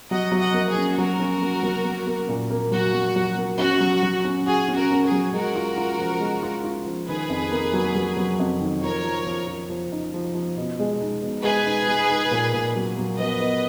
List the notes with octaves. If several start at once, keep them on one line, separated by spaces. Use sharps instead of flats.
F#3 D#5 F#5
F#3
D#5 F#5
A#3
G#4
C#4
F#3 F#4 A#4
C#4
A#3
F#3
A#3
A#3
A#2
A#3
F#3 F#4
F#3
F#3
A#3
C#4 F#4
F#3
F#3
C#4
F#4 G#4
C#4
F#4 A#4
C#4
G#4
F#3
G#3 F#4 A#4
F4
F4
F3
G#3
F4
F4
F3
D#3 G#4 B4
F2
A#3
F#3
F#3
F#3
F2
D#3
F3 A#4 C#5
F3
F3
F3
F3
D#4
F3
F3
B2
G#3
D#4
B2
G#3 G#4 B4
D#4
G#3
D#4
A#2
A#2
F#3
F#3
B3 B4 D#5
B3